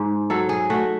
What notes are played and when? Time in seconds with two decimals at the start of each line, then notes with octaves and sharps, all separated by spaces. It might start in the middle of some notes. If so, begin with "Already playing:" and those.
Already playing: G#2
0.30 F#3 A4
0.49 G#4
0.70 A3 F#4